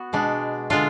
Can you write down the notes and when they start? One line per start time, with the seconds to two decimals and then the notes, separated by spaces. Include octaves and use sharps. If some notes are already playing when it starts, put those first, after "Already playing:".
Already playing: B3 F#4
0.13 B2 G#3 D4
0.70 D3 G#3 D4 F4